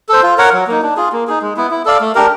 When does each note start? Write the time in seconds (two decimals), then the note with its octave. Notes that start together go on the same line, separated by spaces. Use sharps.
0.09 A4 C5
0.23 F4
0.38 A#4 C#5 F#5
0.53 F#3
0.67 A#3 D#4
0.83 D4
0.96 F4 G#4
1.12 A#3
1.27 D#4 G#4
1.42 G#3
1.56 B3 E4
1.71 E4
1.85 A4 D5 F5
2.00 A3
2.15 D4 G4 A#4